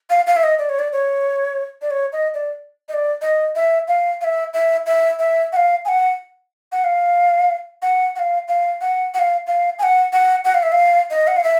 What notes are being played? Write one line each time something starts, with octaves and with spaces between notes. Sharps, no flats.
F5
F5
E5
D#5
D5
C#5
D5
C#5
D5
C#5
D#5
D5
D#5
D5
D#5
E5
F5
F5
E5
E5
E5
E5
F#5
F5
G#5
F#5
F#5
F5
F#5
F#5
F5
F5
F#5
F#5
F5
F5
G#5
F#5
F#5
F#5
F5
E5
F5
D#5
F#5
F5
E5